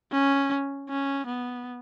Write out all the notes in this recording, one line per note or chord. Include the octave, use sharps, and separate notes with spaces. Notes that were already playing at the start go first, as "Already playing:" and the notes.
C#4
C#4
B3